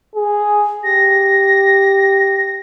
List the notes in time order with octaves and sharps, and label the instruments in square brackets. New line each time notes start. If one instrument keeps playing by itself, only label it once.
[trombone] G#4
[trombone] G4 [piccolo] A#6